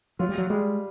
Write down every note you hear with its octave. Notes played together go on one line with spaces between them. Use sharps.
F#3 F4
G3
F#3
G3 G#3